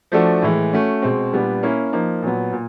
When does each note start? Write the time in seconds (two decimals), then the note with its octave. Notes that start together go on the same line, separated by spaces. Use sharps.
0.12 F3 A3 D4 F#4 A4
0.42 A2 E3 G#3
0.73 A3 C#4 F#4
1.02 B2 G#3 C4
1.33 A#2 G3 B3 D4
1.63 A#3 C#4 E4
1.93 F3 A#3 D#4
2.22 A#2 F#3 B3
2.53 A#2